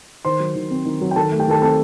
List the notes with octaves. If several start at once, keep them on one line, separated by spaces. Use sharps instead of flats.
D#3 C5 C6
F#3
D#3
C4
D#3
F#3
G5
D#3 A4 A5
A3
G4 G5
D#3 A4 A5
C4 A4 A5